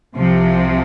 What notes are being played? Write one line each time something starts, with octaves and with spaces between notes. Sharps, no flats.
C2 C3 F3